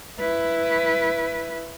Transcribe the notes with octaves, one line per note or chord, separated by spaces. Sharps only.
E4 B4